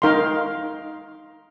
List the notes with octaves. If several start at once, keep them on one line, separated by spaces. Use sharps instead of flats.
D#4 A#4 F5 C6